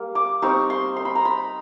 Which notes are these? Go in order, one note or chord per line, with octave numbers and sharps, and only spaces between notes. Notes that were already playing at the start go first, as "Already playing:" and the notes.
Already playing: G3 A#3
D6
G3 C4 D#4 C#6
C6
C6
B5
A#5
B5